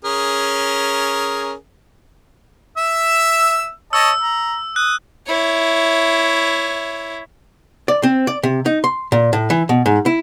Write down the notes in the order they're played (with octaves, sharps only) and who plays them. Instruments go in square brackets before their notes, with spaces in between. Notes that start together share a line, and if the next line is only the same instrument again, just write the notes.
[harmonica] C#4 G#4 A#4
E5 E6
[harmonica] C#5 D#5 A5 [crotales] E6
[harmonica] A#5
[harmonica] D#6 [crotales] F#6
[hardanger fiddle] E4 C#5
[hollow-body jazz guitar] D5
C4
D5
C3
D#4
C6
A#2
A2
E3
B2
G#2
E4